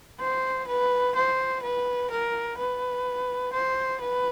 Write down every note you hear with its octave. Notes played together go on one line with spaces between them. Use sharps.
C5
B4
C5
B4
A#4
B4
C5
B4